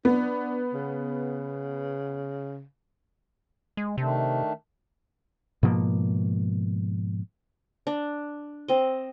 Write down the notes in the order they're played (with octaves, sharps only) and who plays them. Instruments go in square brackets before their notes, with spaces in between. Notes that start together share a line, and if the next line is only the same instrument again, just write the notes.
[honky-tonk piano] B3 [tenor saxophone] D4
[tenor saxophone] C#3
[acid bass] G#3
[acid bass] C3 [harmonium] D#3 A3 D4
[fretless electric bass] G#2 B2 F3 A#3
[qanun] D4
C4 D#5